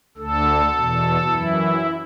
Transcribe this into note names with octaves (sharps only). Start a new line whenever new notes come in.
D2 D3 A4
E2 B2
F#2 E3 E4